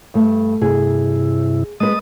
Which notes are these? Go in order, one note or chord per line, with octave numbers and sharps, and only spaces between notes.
G2 A3
G2 C3 E4 G#4
G#3 B4 D#5 A5 D#6